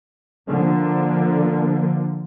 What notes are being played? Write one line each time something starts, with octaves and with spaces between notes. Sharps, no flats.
D3 F3 A#3